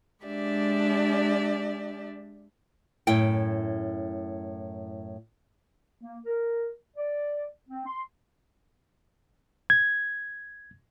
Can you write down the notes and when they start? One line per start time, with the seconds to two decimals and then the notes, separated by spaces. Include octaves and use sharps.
0.24 G#3 D4 G4 D5 E5
3.07 F#2 A2 E4 G5
6.01 A#3
6.26 A#4
6.97 D5
7.69 C4
7.86 C6
9.70 G#6